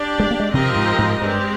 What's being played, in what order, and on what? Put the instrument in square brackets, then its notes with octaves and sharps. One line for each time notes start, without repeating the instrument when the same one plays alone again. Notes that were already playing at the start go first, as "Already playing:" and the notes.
Already playing: [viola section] D4 G4 D5
[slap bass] G#3
A#3
G#3
[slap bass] C3 [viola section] F3 C4 G4 A#4 D#5
[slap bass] G#2
G#2
[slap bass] G2 [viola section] G#3 C4 G4